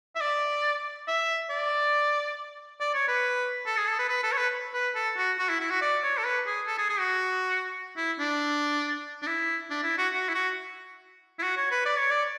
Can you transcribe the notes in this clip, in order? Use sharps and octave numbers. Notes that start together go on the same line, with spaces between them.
E5
D5
E5
D5
D5
C#5
B4
A4
G#4
A4
B4
B4
A4
C#5
B4
B4
A4
F#4
F#4
E4
E4
F#4
D5
C#5
A4
B4
G#4
A4
G#4
G#4
F#4
E4
D4
D4
E4
D4
E4
F#4
F#4
E4
F#4
E4
F#4
C#5
B4
D5
C#5
D5